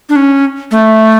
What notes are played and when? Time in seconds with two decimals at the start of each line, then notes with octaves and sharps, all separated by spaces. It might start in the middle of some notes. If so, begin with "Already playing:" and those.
0.09 D4
0.16 C#4
0.71 A3